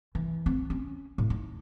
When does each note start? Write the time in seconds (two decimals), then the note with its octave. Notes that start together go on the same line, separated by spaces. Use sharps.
0.15 E3
0.46 C4
0.70 C#4
1.18 A2
1.30 D#4